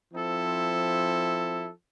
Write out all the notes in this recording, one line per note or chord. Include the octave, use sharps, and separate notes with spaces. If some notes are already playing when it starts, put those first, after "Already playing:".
F3 C4 E4 A4